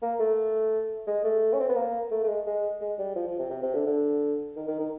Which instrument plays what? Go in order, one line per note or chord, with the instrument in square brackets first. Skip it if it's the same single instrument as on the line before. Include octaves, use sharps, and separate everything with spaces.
[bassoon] A#3
A3
G#3
A3
C#4
C4
B3
A#3
A3
A3
G#3
G#3
G#3
G3
F3
F3
C3
C3
C3
D3
D3
D#3
D#3
D#3